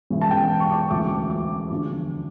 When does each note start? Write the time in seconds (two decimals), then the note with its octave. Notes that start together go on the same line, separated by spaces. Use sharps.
0.10 E1 E2 C#3 E3
0.21 A5
0.31 G5
0.60 C#6
0.71 D6
0.90 E1 D2 C#3 E3 A3 D6
1.30 D6
1.70 E2 D3 F3